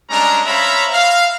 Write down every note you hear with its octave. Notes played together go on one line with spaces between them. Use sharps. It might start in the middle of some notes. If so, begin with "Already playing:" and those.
G3 G#3 C#4 D4 A#5
C5 C#5 E5 F5 A#5 B5
F5